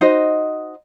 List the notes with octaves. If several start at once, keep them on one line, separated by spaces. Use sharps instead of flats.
D#4 F#4 C5 D#5